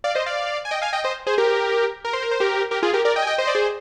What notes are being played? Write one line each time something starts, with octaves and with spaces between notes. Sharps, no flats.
D5 F5
C5 D#5
D5 F5
G#5
D#5 G5
F5 G#5
D#5 G5
C5 D#5
G#4 C5
G4 A#4
A#4
C5
A#4
C5
G4 A#4
G4 A#4
F4 G#4
G4 A#4
A#4 D5
D#5 G5
G#5
D#5 G5
C5 D#5
D5
G#4 C5